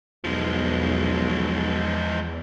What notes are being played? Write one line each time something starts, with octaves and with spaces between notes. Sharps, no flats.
B1 E2 F3 G#3